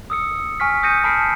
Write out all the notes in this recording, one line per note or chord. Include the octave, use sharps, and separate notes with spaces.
D#6 E6 C#7
G#5 C#6 F6 B6
D#6 G6 A#6 C#7 D#7
A5 B5 F6 B6 C7 D7